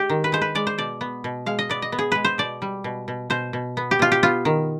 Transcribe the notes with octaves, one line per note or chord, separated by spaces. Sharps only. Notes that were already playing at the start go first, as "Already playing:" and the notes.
Already playing: G#3 G4
D#3
B4
G#3 C5
B4
G#3 D5
C5
B2 D5
B3
B2
G#3 F5
D#5
B3 D5
D#5
B3
G#4
G#3 B4
C5
B2 D5
G3
B2
B2
B2 C5
B2
B3
G4
B2 F4
G4
B3 F4
D#3